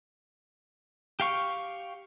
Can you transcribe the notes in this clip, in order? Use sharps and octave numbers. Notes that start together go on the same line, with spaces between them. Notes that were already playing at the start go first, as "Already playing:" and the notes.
G4 F5 C#6